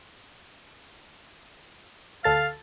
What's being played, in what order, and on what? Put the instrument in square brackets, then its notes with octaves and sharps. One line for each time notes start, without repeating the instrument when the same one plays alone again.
[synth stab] D2 A4 A6 [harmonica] F5